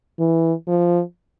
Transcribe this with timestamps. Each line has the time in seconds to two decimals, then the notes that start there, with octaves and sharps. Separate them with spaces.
0.19 E3
0.67 F3